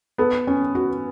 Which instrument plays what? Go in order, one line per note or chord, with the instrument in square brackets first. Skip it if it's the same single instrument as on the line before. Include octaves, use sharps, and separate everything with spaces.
[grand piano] B3 [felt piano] A4
[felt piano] C#4
F#4